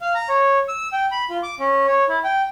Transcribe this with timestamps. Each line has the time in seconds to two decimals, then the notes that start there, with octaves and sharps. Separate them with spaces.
0.01 F5
0.15 A#5
0.29 C#5
0.68 E6
0.92 G5
1.11 B5
1.30 F4
1.43 D6
1.59 C#4
1.87 C#5
2.08 E4
2.24 G5